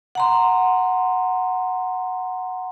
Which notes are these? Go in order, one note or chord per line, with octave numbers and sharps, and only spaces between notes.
F#5 A#5 C6